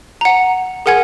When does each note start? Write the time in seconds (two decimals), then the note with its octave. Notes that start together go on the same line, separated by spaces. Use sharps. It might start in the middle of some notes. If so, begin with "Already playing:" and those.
0.21 F#5 A#5
0.86 G#4 A#4 F#5 G#5 G#6